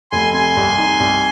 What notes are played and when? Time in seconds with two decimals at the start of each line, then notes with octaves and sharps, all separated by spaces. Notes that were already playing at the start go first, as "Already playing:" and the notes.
0.12 F1 G#5 C6
0.34 C3 G#5 C6
0.57 C2
0.78 D#4
1.00 C2